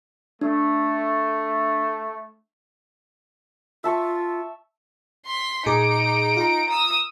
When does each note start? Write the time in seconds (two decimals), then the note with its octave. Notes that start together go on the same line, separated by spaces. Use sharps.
0.41 A3 D4
3.84 F4 E5 A5 C#6
5.26 C6 B6
5.66 A#2 D#4 G#4 D6 D7
6.37 F4 A#5
6.70 D#6 E6